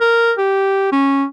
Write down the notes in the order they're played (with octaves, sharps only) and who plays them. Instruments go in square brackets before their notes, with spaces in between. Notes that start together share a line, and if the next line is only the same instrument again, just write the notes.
[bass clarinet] A#4
G4
C#4